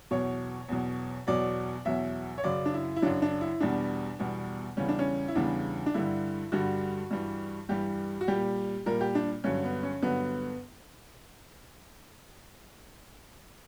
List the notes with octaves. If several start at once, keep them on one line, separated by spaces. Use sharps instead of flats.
E2 B2 F#3 C#5
E2 B2 F#3
E2 B2 F#3 D5
E2 B2 F#3 E5
C#5
F#2 C#3 F#3 D5
D4
E4
E4
F#2 C#3 F#3 D4
D4
E4
E2 B2 G3 D4
E2 B2 G3
E2 C#3 E3 G3 C#4
D4
C#4
E4
E2 C#3 E3 G3 D4
D4
G2 D3 G3 E4
G2 D3 G3 F#4
G2 E3 G3
G2 E3 G3 G4
F#4
A#2 G3 G4
A#2 G3 A#4
G4
D4
G2 D3 F#3 C#4
B3
C#4
G2 D3 F#3 B3